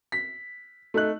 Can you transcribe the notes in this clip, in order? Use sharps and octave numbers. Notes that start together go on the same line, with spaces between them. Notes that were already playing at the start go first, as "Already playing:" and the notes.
B6
A3 D#4 F#6